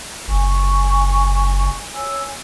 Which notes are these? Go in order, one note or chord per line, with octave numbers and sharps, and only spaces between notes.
F#1 G#5 C#6
C#5 G#5 E6